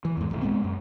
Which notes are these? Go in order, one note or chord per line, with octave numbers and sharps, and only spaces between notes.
E3
E2 G#2
E1 A1 E2
A#2 G#3 B3 C4
F#2